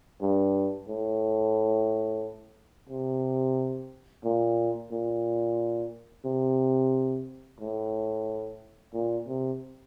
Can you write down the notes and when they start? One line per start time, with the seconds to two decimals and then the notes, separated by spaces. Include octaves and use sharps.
0.21 G2
0.88 A2
2.89 C3
4.24 A#2
4.92 A#2
6.25 C3
7.60 A2
8.93 A#2
9.28 C3